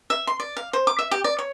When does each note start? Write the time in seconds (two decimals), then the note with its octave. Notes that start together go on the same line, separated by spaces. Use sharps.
0.10 E5
0.27 C6
0.40 D5
0.57 F5
0.73 C5
0.87 D6
0.99 E5
1.11 G4
1.24 D5
1.39 C#5